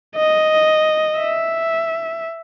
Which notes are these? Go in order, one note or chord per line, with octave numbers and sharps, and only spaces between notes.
D#5
E5